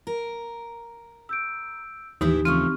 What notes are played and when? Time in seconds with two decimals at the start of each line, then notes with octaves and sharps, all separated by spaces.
0.07 A#4
1.29 E6 G6 D7
2.21 D#2 A2 E3 D#4 E4 G4
2.45 C#3 F3 A3 C4 C#6 F6